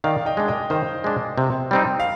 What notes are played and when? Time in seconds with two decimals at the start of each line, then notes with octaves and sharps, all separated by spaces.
0.04 D#3 D5 F5
0.26 D#5 G5
0.37 G#3 D4
0.48 D#5 G5
0.70 D#3 C5 D#5
1.04 G#3 D4
1.38 C3
1.71 G3 C4 D#4
2.00 F5